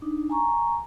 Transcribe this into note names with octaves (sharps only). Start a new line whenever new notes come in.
D4 D#4
G#5 A#5 C#6